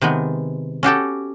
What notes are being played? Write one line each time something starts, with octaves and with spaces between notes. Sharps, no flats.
C3 D#3 G#3 B3
C#4 F#4 G4 A4